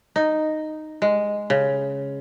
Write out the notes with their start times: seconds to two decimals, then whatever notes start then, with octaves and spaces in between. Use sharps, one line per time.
0.16 D#4
1.02 G#3
1.50 C#3